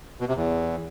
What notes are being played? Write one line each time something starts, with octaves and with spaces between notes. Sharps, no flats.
B2
C3
E2